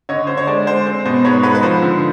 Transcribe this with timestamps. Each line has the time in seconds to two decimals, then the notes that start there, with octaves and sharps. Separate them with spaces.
0.09 D3 C#5 D#5
0.27 D3 C5
0.37 C#5
0.47 G#3 C5 D5
0.67 G#3 C5
0.86 C4 C5
1.05 B2 C5
1.25 G#2 B4 C#5
1.43 G#2 B4
1.55 B4
1.63 F3 C5
1.82 D3